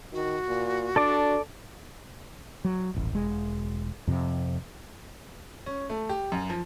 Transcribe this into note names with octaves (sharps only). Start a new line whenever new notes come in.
D#3 F#4
A#2
D4 A4 D5 D6
F#3
D#1 A1
E1 G#3
F2 C3
C#4
A3
G4
F#2
F3